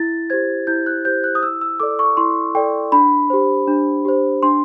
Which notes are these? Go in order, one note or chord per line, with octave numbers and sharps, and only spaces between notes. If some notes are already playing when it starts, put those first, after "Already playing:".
Already playing: E4 A6
G4 C5 G#6
E4 G6
F#6
G4 C5 G6
F#6
D#6
E4 E6
E6
A4 D5 D6
C#6
E4 C6
A4 D5 G5
D4 B5
G4 C5
D4
G4 C5
D4 C6